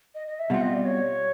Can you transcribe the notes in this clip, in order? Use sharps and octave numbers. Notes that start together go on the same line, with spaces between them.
D#5
D#5
E5
B2 G3 C4 F4 F#5
D#5
D5
C#5